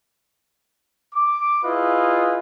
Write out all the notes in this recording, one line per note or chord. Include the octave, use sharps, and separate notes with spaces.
D6
E4 F4 G#4 B4 D#5